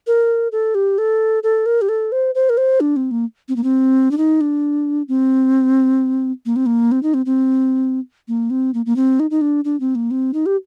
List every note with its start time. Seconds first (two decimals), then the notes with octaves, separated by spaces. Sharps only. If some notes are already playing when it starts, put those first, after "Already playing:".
0.07 A#4
0.52 A4
0.75 G4
0.98 A4
1.43 A4
1.66 A#4
1.82 G4
1.89 A4
2.12 C5
2.35 C5
2.50 A#4
2.57 C5
2.80 D4
2.96 C4
3.11 A#3
3.49 C4
3.56 A#3
3.64 C4
4.11 D4
4.18 D#4
4.41 D4
5.08 C4
6.46 A#3
6.56 C4
6.66 A#3
6.92 C4
7.03 D#4
7.14 C4
7.26 C4
8.28 A#3
8.50 C4
8.74 A#3
8.86 A#3
8.96 C4
9.20 D#4
9.31 D#4
9.41 D4
9.65 D4
9.80 C4
9.95 A#3
10.11 C4
10.34 D#4
10.46 G4